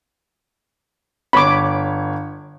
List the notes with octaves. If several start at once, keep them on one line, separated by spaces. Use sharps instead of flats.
G1 C#5 B5 D6